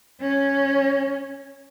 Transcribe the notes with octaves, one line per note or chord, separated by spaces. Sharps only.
C#4